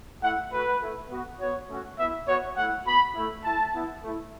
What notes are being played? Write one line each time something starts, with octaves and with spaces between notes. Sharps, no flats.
A3 E4 F#5
A3 F#4 B4
A3 E4
B3 F#4
B3 F#4 C#5
A3 C#4 F#4
B3 E4 E5
B3 F#4 C#5
A3 E4 F#5
B3 F#4 B5
A3 E4
A3 E4 A5
B3 E4
A3 E4